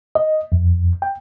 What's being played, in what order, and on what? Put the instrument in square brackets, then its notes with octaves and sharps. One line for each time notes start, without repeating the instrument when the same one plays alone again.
[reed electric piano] D#5
F2
G5